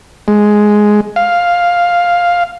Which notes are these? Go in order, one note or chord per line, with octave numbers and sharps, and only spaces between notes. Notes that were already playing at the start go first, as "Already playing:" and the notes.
G#3
F5